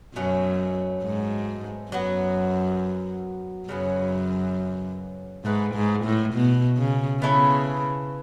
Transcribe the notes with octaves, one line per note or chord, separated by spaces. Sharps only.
F#2 B2 F#3 A3 C#4
G#2
F#2 F#3 B3 F#4
F#2 C#3 F#3 B3
G#2 A3 E4 B4
G#2
A2
B2
C#3
C#3 B3 E4 A4 C#5